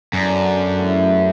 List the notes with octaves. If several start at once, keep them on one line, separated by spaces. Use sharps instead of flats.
F#2 D3 F#3 B3 D4
C#3 E3 A3 E4